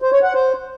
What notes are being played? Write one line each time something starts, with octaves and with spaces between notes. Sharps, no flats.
C5
C#5
F#5
C5